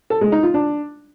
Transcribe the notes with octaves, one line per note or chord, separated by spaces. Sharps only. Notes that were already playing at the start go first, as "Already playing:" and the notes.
A4
G#3
D#4
F4
D4